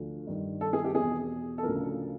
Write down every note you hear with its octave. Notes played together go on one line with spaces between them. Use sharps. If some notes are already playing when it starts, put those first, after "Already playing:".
Already playing: D2 D3 F3
G2 D#3
A4
G#4
G4
E2 B2 G#4
A4
D2 C#3 F3 A#4